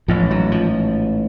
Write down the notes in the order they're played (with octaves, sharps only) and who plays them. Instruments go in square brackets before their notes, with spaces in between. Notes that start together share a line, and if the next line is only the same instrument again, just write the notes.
[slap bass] A1 G#2 F3
F#3
F3